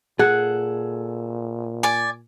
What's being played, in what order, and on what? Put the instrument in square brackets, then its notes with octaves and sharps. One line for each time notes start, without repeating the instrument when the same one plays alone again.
[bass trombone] A#2 [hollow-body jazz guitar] G#4 A4 [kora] F#5
[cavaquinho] D5 G#5